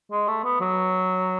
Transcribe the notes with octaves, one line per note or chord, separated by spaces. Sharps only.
G#3
A3
B3
F#3